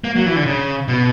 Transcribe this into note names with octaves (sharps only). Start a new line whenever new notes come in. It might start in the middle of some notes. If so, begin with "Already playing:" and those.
A#3
F#3
E3
D3
C#3
B2